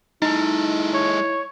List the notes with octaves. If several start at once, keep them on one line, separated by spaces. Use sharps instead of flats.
G#3 D#4 E4 A4
C#5